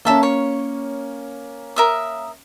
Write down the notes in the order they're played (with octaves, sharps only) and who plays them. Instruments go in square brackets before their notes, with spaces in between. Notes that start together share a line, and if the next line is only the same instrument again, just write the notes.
[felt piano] A#3 C#4 [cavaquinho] A4 E5 A5
[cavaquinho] C#5
A#4 E5 D#6